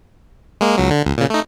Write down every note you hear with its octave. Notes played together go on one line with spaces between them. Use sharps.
G#3 A#3
C#2 F#3
D3
C#2
A#2 C#3
A3 D#4